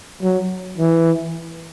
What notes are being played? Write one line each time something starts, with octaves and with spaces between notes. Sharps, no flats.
F#3
E3